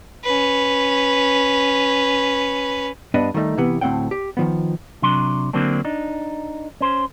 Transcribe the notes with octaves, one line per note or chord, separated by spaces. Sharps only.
C#4 B4
G2 B3 D4 B4 D#5
D#3 G3 A3 D#4
C3 E3 B3
D2 A2 C4 F#5 G5
G4
D#3 F3 B3
C3 F#3 D4 C6
D3 F#3 A#3 C4 D4
D4 D#4
C#4 C5